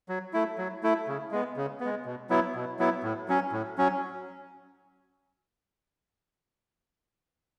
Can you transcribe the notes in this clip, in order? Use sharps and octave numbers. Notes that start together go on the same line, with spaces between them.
F#3
A3 E4
F#3
A3 E4
C#3
G#3 B3
C#3
B3
G#3
B2
F#3 B3 E4
B2
F#3 B3 E4
A2
F#3 C#4
A2
F#3 C#4